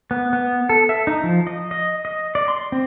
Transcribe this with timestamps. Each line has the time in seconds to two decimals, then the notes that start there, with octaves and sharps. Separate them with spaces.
0.11 B3
0.33 B3
0.69 A4
0.89 E5
1.07 D#4
1.23 F3
1.47 D#5
1.71 D#5
2.05 D#5
2.35 D5
2.48 C6
2.72 C4